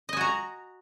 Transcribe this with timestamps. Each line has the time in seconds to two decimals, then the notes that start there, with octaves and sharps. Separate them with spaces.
0.09 D#5
0.13 G#5
0.17 F#4
0.21 A#5